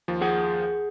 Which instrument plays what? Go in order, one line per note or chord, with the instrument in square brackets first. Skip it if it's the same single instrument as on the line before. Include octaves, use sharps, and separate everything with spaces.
[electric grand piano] D#2 F3
[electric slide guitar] G#4 F#5